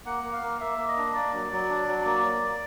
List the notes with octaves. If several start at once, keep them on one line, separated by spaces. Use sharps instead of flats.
A#3 F#5
A#3
F5
A#3
A#3 E5
A#3
D#5
D4
A#3 D5
F#3
F#3
D4
F#3
A#3